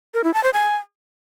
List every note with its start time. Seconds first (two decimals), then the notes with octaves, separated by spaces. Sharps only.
0.14 A#4
0.24 E4
0.34 A5
0.44 C5
0.53 G#5